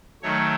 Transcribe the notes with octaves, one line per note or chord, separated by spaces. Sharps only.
D#3 F#3 A3 C#5